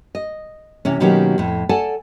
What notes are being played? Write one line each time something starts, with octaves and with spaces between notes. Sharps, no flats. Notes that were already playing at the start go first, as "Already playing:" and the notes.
D#5
C3 E3 C#4
B2 D#3 F#3 A#3 C#4 G4
F2 A2
A4 D5 F#5 G#5 A5